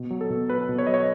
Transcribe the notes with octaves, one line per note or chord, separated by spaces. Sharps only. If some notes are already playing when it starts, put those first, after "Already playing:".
Already playing: B2
F#3
A4
B2
F#3 B4
B2
C#5
F#3 D#5
C#5